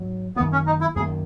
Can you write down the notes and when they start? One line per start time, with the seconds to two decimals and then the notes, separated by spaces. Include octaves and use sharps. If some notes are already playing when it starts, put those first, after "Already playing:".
Already playing: G#2 F#3
0.36 A#3 B3
0.40 F#2 D#3
0.52 C#4
0.66 D#4
0.81 E4
0.96 F#2 G#4
0.99 D#3 A#3